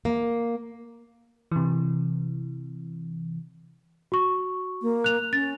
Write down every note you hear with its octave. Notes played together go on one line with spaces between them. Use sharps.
A#3
C3 E3
F#4 C#6
A#3
F#6 F7
C#4 A6